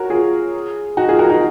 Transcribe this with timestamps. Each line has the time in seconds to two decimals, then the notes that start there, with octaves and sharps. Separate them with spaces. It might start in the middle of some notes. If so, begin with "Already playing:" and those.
Already playing: F#4 A#4 C#5
0.10 F4 G#4
0.97 D#4 F#4
1.09 F4 G#4
1.19 F#4 A#4
1.30 D#4 F#4